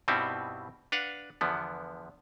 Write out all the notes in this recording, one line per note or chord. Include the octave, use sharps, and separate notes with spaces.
G2 B2 G3 C4 D#4 E4
D4 B4 F5 F#5
E2 D3 F3 B3